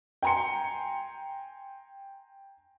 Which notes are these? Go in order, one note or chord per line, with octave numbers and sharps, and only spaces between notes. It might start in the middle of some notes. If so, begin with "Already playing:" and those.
G5 G#5 A#5 C6 C#7